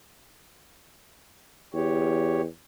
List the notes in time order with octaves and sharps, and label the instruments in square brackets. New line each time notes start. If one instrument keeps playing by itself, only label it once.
[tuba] E2 [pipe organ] G4 C#5